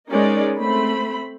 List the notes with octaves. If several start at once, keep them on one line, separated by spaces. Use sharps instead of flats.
G#3 C#4 D#4 A#4 D5
A3 C4 C5 B5